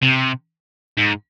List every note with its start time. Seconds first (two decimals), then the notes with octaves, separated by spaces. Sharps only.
0.03 C3
0.97 G#2